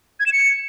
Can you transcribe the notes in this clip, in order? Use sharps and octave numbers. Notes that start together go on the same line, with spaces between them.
G#6
E7
C#7